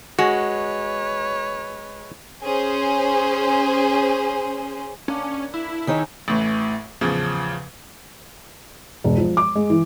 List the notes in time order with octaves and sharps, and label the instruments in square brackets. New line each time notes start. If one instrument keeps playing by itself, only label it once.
[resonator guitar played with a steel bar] G#3 [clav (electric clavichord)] F#4 [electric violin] B4 C#5
[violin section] C#4 G#4 C5
[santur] A#3 D4 F#5 [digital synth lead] C#4
[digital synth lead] E4
[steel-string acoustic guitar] D#3 D#4 C#5 [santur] G#4
[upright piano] A1 A2 E3
A1 E2 C#3 F3
[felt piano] E1
F3
D6
G#3
E3